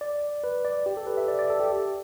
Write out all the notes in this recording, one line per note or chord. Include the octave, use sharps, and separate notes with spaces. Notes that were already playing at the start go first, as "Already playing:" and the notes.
D5
B4
D5
G4
A4
B4
E5
D5
D5
A4
G4